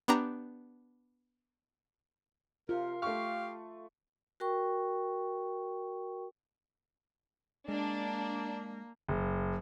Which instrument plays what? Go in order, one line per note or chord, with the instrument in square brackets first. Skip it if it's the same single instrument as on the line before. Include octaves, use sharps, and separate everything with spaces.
[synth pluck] B3 D4 G4 A#5
[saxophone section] C3 A#4 [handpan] F4
[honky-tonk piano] A3 C#6 [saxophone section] G4 F5
[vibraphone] F#4 A#4 G5 C#6
[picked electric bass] G#3 [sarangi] A#3 [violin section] D4
[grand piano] F#1